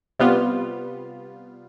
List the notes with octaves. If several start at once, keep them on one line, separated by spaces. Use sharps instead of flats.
C3 G3 B3 F4